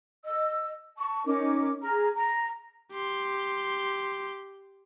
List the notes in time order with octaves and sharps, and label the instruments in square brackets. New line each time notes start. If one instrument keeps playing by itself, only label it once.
[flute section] D#5 E6
A5 C#6
C#4 D#4 A#4 D6
G#4 A#5 F6
A#5
[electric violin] G4 C6